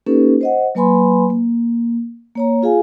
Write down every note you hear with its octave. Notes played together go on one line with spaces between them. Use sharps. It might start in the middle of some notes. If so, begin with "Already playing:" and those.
A#3 C#4 D#4 G4 A4 B4
C5 D#5 F#5
F#3 A#3 B4 G#5 B5 C6
A#3
A#3 C#5 A#5
F4 G#4 F5 G#5